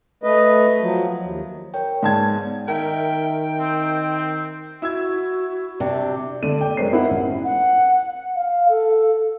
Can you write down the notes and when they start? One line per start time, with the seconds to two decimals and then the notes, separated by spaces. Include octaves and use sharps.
0.23 A3 B4 D#5
0.80 F3 F#3
1.20 D#2
1.74 A#4 C#5 G5
2.03 G#2 B3 D5 A5 G#6
2.68 D#3 A#4 E5 G5
3.60 C4
4.82 E4 F#4 E6 G#6
5.80 C3 D4
6.43 D3 A3 D5 D#7
6.61 D5 G5
6.77 F#2 G#3 A#4 C5 C#5 C7
6.92 C4 D#4 E4 A#4 F#5
7.11 A1
7.44 F#5
8.36 F5
8.69 A4